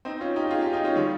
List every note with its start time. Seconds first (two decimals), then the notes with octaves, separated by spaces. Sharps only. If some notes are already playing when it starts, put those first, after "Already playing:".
0.05 C4 D#4
0.21 C#4 F4
0.36 D#4 G4
0.51 F4 G#4
0.62 D#4 G4
0.73 D#4 G4
0.84 C#4 F4
0.96 D#3 G3